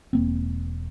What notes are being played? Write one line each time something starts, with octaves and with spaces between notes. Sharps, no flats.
E1 A#3 C4